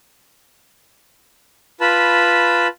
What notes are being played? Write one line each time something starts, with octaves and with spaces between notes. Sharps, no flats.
F4 B4 A5 B5